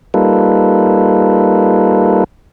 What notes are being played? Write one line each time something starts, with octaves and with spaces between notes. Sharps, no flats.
G3 A#3 D#4 F4 A4 B4